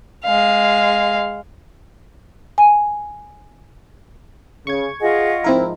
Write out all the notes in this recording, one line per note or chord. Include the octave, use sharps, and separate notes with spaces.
G#3 F5
G#5
C#3 C#6 G#6
F4 G#4 D#5 F#5
G#2 F3 C4 D#4 E4 A#4